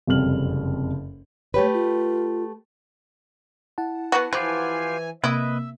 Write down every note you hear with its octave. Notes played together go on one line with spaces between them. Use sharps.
F#1 F2 C3 G3 F6 F#7
A3 G4 B4 C#5
F4
E4 F#5 A5
B3 F#4
E3 F3 F4 G4 B4 G#5
C3 A#3 E4 B4 D#5 E5